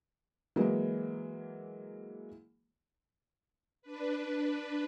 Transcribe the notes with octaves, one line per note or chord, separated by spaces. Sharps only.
E3 F#3 G#3 A#3
D4 B4